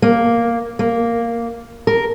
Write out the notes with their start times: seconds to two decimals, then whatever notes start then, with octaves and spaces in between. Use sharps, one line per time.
0.02 A#3
0.79 A#3
1.87 A#4